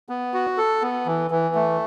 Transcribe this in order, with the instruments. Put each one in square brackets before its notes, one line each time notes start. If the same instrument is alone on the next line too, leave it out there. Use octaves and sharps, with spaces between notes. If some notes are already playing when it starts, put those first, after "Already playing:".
[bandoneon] B3
F#4
A4
B3
E3
E3
A3